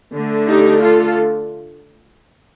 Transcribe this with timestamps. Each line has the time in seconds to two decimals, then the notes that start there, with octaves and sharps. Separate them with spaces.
0.13 D3 A3 D4
0.46 D#4 G4
0.81 F4 A4